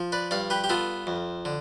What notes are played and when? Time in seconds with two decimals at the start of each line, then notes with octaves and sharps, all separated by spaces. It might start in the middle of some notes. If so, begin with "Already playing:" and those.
Already playing: F3
0.12 B4 D5
0.31 G2 D5 F5
0.50 G4 B4
0.64 G4
0.69 B3 F4 A4
1.07 F2
1.45 D3